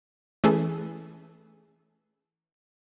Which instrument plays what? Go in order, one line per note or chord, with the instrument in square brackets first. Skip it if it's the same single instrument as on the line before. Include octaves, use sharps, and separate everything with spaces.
[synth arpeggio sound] E3 A3 C#4 G#4 A4